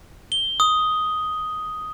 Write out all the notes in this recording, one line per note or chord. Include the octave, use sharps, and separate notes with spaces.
G7
D#6